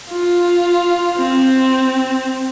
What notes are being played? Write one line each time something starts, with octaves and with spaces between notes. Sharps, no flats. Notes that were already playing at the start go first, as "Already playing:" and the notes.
F4
C4